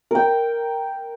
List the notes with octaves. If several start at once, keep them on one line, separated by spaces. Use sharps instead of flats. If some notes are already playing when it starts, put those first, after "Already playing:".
A#4 G5